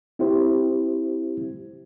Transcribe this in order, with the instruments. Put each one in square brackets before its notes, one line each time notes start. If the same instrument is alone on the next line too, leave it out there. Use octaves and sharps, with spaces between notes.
[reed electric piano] C4 E4 G4 C5